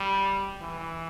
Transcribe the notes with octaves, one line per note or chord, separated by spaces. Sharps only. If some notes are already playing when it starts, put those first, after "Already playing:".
Already playing: G3
E3